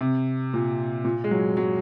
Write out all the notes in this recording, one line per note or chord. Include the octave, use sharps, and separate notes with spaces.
C3
A#2
A#2
G#3
F#3
F#3